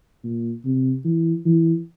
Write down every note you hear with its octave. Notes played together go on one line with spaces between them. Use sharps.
A#2
C3
E3
E3